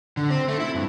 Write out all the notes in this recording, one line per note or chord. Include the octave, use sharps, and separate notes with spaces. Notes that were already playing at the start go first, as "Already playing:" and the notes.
D3
C4
A3
E4
G2